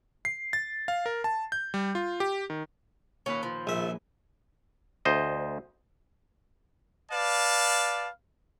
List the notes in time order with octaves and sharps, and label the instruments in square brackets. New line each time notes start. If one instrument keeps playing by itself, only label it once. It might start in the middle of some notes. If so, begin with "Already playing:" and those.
[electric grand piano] C7
A6
F5
A#4
A5
G6
G3
F4
G4
D#3
[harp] D#2 A#2 B4 [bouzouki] C#4
[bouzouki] F3
[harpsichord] A#1 E5 [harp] G#4
[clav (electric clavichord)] D2 C5 D#5
[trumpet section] B4 D5 F5 A5